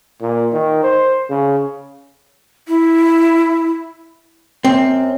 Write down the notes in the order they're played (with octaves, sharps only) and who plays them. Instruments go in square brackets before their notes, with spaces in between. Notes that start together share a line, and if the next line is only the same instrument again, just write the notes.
[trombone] A#2
D#3
C5
C#3
[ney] E4
[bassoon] F#2 [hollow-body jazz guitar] C4